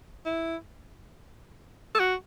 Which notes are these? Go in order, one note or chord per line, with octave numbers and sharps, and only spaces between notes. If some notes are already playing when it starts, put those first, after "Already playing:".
E4
A4
F#4